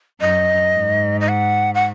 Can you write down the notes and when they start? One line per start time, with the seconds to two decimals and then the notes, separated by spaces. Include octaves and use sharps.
0.21 F#2 D#5
0.75 G#2
1.21 D#5
1.29 F#5
1.75 F#5